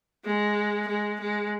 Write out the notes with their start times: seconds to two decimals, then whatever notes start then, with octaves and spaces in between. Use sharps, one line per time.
0.25 G#3
0.87 G#3
1.20 G#3